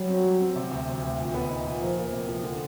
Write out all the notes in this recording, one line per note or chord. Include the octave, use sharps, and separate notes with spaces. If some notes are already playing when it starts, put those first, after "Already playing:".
Already playing: F#3 G3
C4
G3
C4
C3
D2
C3
D2
A#2
B3
D#4
A#2
F3 A#3
A#3
C3
F3
D3